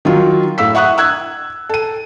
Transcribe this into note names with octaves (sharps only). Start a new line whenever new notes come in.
D#3 F#3 F4
A2 F5 E6 B6
E5 F#5 C#6 D#6 F#6
E6 F#6 G#6
A4 D#7